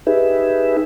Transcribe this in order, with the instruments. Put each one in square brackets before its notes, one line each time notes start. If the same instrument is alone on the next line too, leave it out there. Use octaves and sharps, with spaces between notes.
[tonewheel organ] D#4 G4 G#4 B4 E5